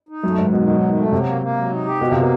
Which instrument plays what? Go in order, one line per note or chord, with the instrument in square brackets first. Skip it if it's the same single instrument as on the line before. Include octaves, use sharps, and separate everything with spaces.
[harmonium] D#4
[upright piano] F#2 [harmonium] A3
[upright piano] G#2 [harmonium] D#3
[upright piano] B2 [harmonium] D#3
[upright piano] B2 [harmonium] F#3
[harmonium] D#3
A3
[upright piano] C3 [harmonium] F#3
[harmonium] A#3
A#3
F#3
D#4
G4
[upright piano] B2 [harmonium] F3
[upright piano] C3 [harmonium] A#3
[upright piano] B2